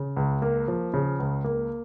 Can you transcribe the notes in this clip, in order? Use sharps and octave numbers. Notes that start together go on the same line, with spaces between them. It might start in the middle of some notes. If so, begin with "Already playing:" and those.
Already playing: C#3
C#2
A#3
F3
C#3
C#2
A#3